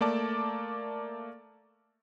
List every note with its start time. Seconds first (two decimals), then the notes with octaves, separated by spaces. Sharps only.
0.01 A3 A#3 D5 A5 D6